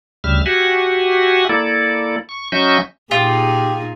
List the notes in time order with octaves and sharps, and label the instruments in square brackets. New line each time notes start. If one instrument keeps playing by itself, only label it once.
[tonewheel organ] D2 C#3 G3 E5 F6
F#4 G4 E5 F#5 G#5
A#3 E4 A4 D5
C#6
F#3 C#4 D#5 E5 C#6 G6
[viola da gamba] A#2 D#4 G#4 [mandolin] F4 [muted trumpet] G4